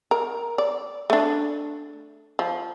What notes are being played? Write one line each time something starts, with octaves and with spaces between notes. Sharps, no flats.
A#4
D5
A3 D4
F3